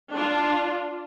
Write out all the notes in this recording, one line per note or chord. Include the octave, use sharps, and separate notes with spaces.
D4 F4